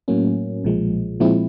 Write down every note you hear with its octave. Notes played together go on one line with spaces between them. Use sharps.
A2 F#3 A#3 C#4
B1 A#2 F3 G#3
A#2 F3 G#3 C4 E4